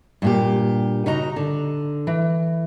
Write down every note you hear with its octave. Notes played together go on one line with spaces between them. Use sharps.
G2 A#2 G4
C#3 D#4 F#4 A#5
D3
E3